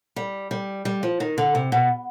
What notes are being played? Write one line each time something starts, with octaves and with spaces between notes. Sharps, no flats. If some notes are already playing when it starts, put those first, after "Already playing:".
G3
G3
G3
F3
D#3
D3
C3
B2